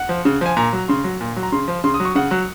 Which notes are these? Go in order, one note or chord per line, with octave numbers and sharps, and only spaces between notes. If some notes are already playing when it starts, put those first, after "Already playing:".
Already playing: F#5
F3
C#3
F3 G#5
A#2 A#5
F#3
C#3 C6
F#3
A#2
F#3
A#5
C#3 C6
F3
C#3 C6
D#6
F#3
C#6
C#3 F#5
F#3